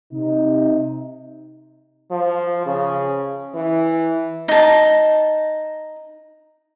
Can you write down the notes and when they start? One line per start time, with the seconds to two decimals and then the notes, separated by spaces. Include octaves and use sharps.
0.13 C3 D#4
2.11 F3
2.66 C#3
3.55 E3
4.48 D#4 A5